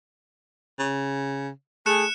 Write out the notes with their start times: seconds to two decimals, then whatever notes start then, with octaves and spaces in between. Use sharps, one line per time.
0.79 C#3
1.86 A3 G#4 F#6 C#7 E7